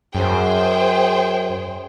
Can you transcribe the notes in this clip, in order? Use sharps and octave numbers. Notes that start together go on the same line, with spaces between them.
F#2 G#4 C5 G5